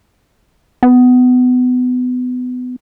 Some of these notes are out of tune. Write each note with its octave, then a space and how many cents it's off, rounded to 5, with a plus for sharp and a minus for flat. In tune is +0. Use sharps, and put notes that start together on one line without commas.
B3 +25